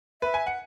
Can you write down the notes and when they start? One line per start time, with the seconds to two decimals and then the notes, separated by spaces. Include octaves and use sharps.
0.22 B4 E5
0.34 G#5
0.47 F#5